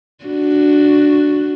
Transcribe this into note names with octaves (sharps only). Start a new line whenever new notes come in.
D4 F#4